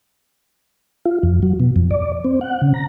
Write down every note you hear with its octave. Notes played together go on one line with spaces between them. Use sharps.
F4
F2
F#3
B2
F2
D5
C4
F#5
C#3
A#5